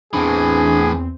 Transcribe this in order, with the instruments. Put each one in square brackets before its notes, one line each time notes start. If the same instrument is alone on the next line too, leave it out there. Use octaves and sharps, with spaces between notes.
[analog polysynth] E2 C4 [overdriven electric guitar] A2 E3 [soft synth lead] D4 [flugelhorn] G#4